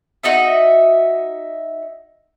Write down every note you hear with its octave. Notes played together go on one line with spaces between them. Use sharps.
D#4 F#4 D#5 E5